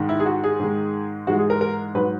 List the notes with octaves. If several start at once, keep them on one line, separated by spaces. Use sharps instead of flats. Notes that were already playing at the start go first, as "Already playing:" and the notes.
Already playing: G#2 D#3 G#3
E4
G#4
F#4
G#4
G#2 D#3 G#3
G#2 E3 G#3 F#4
G#4
A#4
A#4
G#2 F#3 B4